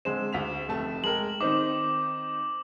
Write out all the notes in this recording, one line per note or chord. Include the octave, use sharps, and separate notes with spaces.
D3 G#3 C4 E7
D2 B6 F7
F1 A3 A5
G#3 A#4 G5 F#7
D#3 C4 D#4 D6